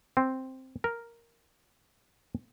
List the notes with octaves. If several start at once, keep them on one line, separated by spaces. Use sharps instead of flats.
C4
A#4